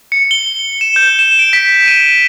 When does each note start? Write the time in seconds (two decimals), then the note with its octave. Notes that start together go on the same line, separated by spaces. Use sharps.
0.12 C#7
0.31 G7
0.81 E7
0.96 G6
1.19 E7
1.39 D7
1.53 B6
1.87 D#7